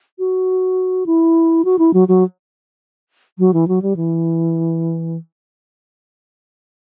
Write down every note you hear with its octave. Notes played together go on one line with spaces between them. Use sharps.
F#4
E4
F#4
E4
F#3
F#3
F#3
E3
F#3
G3
E3